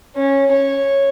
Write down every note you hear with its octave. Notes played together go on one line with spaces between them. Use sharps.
C#4
C#5